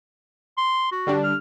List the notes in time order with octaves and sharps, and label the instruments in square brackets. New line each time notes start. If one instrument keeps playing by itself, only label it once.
[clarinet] C6
F#4
[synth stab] D3 G3 D4
[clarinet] F6